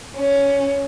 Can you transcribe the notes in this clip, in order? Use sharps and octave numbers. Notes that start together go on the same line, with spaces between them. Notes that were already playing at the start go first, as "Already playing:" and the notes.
C#4